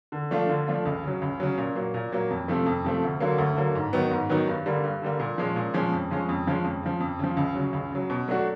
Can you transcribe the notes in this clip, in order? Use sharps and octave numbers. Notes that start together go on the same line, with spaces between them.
D3
F3 A3 D4 F4
D3
F3 A3 D4 F4
C#2
C#3 F#3
C#2
C#3 F#3
A#2
F#3 A#3
A#2
F#3 A#3
F2
C3 F3 A3
F2
C3 F3 A3
D2
D3 F#3 A#3
D2
D3 F#3 A#3
G#2
D#3 F#3 B3 D#4
G#2
D#3 F#3 B3 D#4
G2
D3 G3 A#3
G2
D3 G3 A#3
A#2
F3 G#3 C#4
A#2
F3 G#3 C#4
F2
C#3 F3 G#3 C#4
F2
C#3 F3 G#3 C#4
F2
C#3 F3
F2
C#3 F3
C#2
C#3 F#3
C#2
C#3 F#3
B2
F#3 A3 D4 F#4